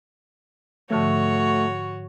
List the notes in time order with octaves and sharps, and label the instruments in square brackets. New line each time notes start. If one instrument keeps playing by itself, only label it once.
[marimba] G#2 D3 F3 [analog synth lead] A3 [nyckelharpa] F#4 C#5